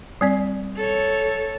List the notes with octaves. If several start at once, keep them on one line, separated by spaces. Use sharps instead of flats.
G3 C4 D5
A4 C#5